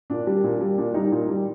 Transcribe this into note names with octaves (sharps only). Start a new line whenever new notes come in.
A#2 D4
G3
A#2
G3
A#2 D4
G3 D#4
A#2
G3